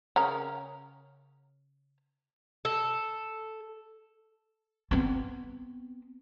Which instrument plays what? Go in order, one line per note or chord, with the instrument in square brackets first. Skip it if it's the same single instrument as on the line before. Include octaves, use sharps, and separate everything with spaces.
[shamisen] C#3 C#4 A#4
[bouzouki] A4
[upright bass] B3 C4